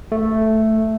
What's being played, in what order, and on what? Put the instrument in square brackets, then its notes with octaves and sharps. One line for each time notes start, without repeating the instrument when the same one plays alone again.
[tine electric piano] A3